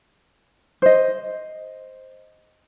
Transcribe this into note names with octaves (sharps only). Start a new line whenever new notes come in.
C5 D#5